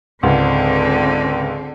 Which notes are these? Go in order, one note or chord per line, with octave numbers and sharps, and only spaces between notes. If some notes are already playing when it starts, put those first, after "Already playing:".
C#2 G#2 D3 C4